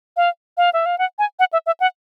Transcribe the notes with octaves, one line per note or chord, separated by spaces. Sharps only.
F5
F5
E5
F5
F#5
G#5
F#5
E5
E5
F#5